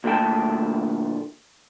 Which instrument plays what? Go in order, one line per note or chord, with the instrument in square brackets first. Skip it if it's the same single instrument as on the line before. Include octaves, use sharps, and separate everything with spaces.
[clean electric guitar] D2 A#2 A3 G4 G5 A5